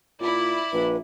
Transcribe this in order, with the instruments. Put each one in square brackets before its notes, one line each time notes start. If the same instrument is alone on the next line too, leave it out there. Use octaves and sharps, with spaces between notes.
[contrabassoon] A#2 [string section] E4 [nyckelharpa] D5
[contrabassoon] A#1 [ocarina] B4